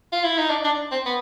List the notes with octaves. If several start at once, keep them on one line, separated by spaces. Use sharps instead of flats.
F4
E4
D#4
D4
D4
C4
B3